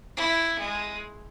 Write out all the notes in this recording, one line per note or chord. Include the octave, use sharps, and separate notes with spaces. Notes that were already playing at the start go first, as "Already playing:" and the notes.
E4
G#3